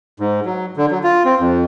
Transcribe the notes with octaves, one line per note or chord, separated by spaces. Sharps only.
G#2
F#3
D3
F#3
F4
C4
F2